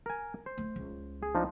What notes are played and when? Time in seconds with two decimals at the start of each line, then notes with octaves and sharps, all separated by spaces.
0.06 A#4 G#5
0.46 C5
0.58 A3
0.76 C#2
1.23 G#4
1.35 F3 D4 D#4